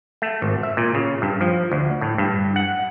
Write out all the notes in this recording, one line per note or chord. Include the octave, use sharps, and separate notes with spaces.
A3
G#1
E5
A#2
C#3
G2
F3
D2
A2
G2
F#5